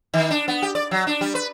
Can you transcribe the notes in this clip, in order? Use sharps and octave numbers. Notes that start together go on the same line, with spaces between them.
D#3
D4
B3
G4
D5
F#3
D4
G3
B4